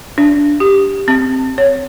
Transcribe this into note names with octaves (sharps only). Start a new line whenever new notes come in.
D4
G4
C4
C#5